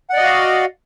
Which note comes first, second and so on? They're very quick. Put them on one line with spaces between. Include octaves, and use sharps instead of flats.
F#5 D5 D#5 F#4 F5